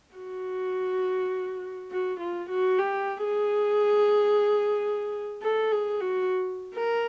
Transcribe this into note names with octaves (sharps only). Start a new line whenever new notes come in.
F#4
F#4
F4
F#4
G4
G#4
A4
G#4
F#4
A#4